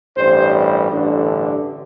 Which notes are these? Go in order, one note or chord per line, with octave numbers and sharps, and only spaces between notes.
A1 G2 G3 C5
A1 G2 D3